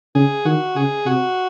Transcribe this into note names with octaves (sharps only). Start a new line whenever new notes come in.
C#3 G#4
D#3 F#4
C#3 G#4
C3 F#4